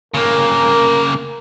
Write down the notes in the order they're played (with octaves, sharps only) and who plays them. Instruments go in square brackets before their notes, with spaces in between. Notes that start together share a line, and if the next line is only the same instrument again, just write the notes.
[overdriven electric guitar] C#3 A#3 [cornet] A#4